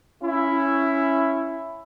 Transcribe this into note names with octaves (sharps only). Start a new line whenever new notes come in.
C#4 E4